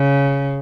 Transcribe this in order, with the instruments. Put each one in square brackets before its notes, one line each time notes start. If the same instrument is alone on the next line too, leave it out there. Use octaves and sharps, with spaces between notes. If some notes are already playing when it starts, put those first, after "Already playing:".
Already playing: [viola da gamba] C#3